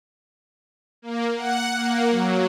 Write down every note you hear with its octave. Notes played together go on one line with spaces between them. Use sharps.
A#3
F#5
A#3
F#3